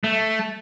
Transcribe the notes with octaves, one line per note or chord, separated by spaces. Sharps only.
A3